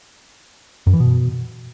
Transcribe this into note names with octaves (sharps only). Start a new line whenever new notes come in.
F#2
E3
B2